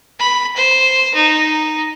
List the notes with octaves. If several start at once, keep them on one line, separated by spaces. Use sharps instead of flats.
B5
C5
D#4